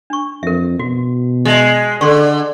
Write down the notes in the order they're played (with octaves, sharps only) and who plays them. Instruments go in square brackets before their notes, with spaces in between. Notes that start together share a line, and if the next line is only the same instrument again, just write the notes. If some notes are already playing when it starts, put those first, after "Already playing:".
[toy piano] D4 C#6
[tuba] F2 [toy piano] A#4 E5
[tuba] B2 [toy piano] F#4
[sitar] G#3 [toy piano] D#5 E5 A5
[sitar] D3 [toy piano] A4 C6 C#6